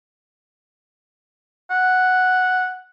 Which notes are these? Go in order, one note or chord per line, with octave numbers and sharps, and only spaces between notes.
F#5